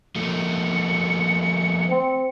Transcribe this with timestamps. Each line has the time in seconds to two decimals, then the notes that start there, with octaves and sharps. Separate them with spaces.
0.16 F3 A3 A#3 C#7
1.89 C4